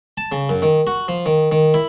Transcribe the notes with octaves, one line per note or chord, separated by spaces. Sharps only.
A5
C#3
F#2
D#3
F#4
F3
D#3
D#3
E4